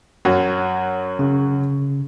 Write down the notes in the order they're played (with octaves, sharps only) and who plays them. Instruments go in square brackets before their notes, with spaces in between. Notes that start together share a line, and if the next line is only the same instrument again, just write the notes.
[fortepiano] F#2 F#3
[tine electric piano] C#3